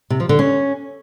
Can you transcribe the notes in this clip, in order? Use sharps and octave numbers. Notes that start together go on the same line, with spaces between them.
C3
F3
D3
C#4